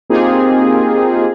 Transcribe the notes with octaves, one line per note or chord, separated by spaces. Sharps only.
A#3 C4 D#4 F4 G4 G#4